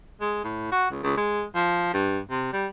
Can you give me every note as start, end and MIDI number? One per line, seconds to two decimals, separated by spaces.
0.21 0.42 56
0.44 0.69 45
0.72 0.86 66
0.90 1.02 37
1.03 1.17 37
1.17 1.43 56
1.55 1.90 53
1.94 2.19 43
2.30 2.53 48
2.53 2.67 55